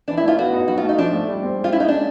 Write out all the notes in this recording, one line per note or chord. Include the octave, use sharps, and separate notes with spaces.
E3 D4
E4
A3 F4
B3 F#4
D#4
F#3 F#4
F4
A3
D#4
F3 D4
A3
G3
C4
G#3
F4
C#4 E4
D#4
G#3 D4